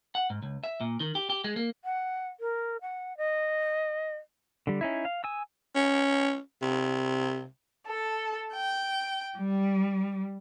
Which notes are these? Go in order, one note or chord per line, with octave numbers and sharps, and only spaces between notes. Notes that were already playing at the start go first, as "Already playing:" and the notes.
F#5
G#2
C#2
E5
A#2
D#3
G4
G4
G#3
A#3
F#5
A#4
F#5
D#5
D3 G3
C#4 D#4 E4
F5
G#5 D#6 E6
C#4
C3
A4
G5
G3